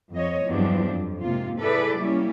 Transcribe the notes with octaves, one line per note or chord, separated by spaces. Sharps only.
F2 C#5 D#5
E2 G2 F3 F#3 C4 D4
F2
G#2 C3 A#3 F4
E4 G#4 A4 B4 D5
G3 A#3 C#4 E4